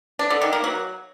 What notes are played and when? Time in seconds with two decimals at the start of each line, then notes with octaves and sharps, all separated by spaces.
0.19 D4
0.30 D3
0.41 D#3
0.53 A#3
0.64 F#3